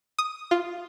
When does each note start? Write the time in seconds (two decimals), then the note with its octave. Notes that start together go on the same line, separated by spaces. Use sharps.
0.18 D#6
0.51 F4